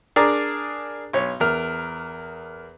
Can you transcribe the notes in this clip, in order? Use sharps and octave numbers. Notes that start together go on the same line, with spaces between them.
D4 G#4 A#4 D5 A#5
B1 C#5
E2 A#4 F6